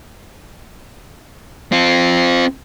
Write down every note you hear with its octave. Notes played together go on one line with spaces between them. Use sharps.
C4 F4